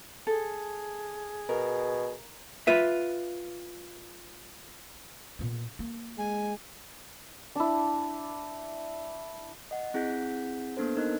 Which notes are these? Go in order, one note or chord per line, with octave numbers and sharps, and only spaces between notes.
G#4 A4
B2 A#4
F4 B4 E5
A#2 B3
A#3
G#3 G#5
D4 E4
D#5 F#5
C4 E4 G#4 F#5 G6 B6
A#3 B3 D4 A4 C5
D#4 A#4 D#5 F#6